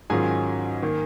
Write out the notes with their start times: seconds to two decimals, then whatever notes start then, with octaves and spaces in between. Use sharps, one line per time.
0.10 G#2 D#3 F#3 C#4 F4 G#4 G#5
0.82 D#3 A#3